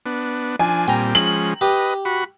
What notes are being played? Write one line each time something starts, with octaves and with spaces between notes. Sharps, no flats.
B3 D4
F3 D4 G#5
A#2 G3 C4 G5 A#5
F3 G#3 C#4 F#7
G4 B4 D#5
F#4 B5